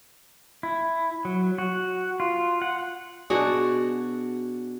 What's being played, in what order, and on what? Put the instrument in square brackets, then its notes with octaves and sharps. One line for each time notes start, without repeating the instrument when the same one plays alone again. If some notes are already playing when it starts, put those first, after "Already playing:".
[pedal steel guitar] E4
F#3
F#4
F4
F#5
[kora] B2 D4 F#4 G#4